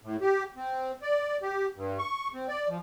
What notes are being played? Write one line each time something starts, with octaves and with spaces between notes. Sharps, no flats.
A2
G4
C4
D5
G4
G2
C#6
C4
D5
F3